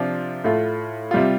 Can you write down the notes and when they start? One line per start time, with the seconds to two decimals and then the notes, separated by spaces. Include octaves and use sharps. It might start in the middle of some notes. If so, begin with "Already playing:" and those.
Already playing: C3 F3 D4 F4
0.44 A2 A3 F4
1.11 C3 G3 F4